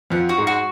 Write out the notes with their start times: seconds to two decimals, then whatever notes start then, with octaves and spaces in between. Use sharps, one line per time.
0.10 F2 F3 F#5
0.29 F#4
0.38 G#2 G#3
0.47 F#4